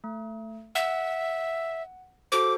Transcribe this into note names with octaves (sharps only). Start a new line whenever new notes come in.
A3
E5 F#5
F#4 A4 C5 D6